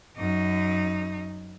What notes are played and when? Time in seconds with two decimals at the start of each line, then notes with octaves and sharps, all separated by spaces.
0.17 F#2 D#4